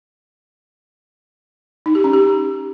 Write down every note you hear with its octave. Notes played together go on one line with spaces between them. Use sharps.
D#4
G4
C#4
G4